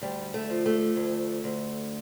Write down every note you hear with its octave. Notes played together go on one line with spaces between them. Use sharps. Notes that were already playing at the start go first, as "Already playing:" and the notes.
D2 G3
A3
F3
A3
D2
D2